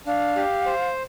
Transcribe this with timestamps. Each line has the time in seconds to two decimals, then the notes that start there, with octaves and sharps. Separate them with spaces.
0.06 D4 F5
0.36 G4
0.66 C5